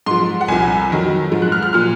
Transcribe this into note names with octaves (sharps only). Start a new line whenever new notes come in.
G#2 F3 C6
F#5
C2 C3 F3 G#5
F2 D#3 F#3
G#2 F3
F#6
F6
F6
A#2 F3 F6